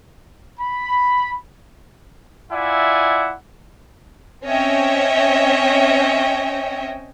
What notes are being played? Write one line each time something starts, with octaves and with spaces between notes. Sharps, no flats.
B5
E4 F4 D5 E5 F#5 G#5
C4 C#4 C#5 D#5 E5 G5